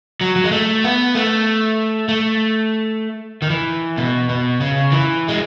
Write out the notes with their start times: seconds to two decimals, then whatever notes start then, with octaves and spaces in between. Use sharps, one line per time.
0.21 F#3
0.36 F#3
0.44 G#3
0.52 A3
0.84 B3
1.15 A3
2.09 A3
3.42 D#3
3.50 E3
3.97 B2
4.29 B2
4.61 C#3
4.92 E3
5.28 G#3